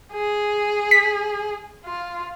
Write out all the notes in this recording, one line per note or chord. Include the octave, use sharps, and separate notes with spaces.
G#4
B6
F4